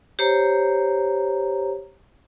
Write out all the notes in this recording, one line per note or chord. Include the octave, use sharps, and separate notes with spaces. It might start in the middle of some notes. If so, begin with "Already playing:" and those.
G4 C5 C#5 A#5